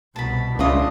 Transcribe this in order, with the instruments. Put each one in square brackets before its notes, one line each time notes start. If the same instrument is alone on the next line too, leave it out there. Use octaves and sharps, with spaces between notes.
[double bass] C2 B2 [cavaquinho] A5 B5
[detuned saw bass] C#2 [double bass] D4 [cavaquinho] E4 F4 D#5